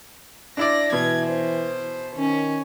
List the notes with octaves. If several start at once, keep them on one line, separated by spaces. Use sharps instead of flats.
D4 E4 D5 A#6
B2 E3 G#6
C5
D#3 C#4